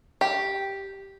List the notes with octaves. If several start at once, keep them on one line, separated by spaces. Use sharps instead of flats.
G4